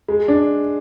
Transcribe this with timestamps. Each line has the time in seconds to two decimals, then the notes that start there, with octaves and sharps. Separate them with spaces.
0.08 G#3
0.28 D4